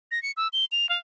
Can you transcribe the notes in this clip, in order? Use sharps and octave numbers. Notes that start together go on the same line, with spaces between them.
A#6
C#7
E6
G7
F7
F5